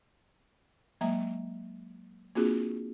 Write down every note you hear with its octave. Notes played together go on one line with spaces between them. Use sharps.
F#3 G#3 A#3 E5 A#5
A#3 C4 D4 F4 F#4 G#4